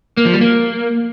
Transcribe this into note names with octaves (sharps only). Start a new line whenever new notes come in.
A#3
F3
G3
A#3